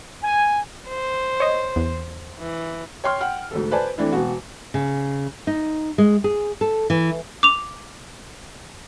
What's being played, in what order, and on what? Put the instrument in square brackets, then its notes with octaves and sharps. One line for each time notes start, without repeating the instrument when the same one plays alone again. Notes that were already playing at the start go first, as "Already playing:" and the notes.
[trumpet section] G#5
[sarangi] C5
[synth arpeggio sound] C#5 D#5
E2
[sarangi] E3
[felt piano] C#5 G5 C6 F6
F#5 G5 F6
D2 G#2 A4
B4 C5 D5 G#5 A5
E3 A3 C4 D4 E4
E1 B2 F#4
[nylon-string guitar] C#3
D#4
G#3
G#4
A4
E3
[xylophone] D6 F7